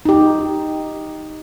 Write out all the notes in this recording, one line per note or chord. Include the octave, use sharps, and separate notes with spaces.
D#4 G4